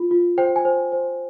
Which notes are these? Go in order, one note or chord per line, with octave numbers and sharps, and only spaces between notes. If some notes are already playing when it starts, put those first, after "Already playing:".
Already playing: F4
F4
C5 G5
G#5
C5
C5